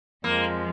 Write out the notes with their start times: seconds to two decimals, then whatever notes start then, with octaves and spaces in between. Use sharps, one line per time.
0.24 F2 F3 G#3 A#3